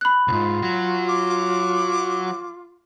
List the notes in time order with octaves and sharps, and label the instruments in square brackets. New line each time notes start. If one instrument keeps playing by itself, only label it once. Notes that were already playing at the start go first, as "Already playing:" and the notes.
[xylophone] B5 F#6
[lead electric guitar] C2 G#2 [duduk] F4
[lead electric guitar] F#3 F#4
[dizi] D6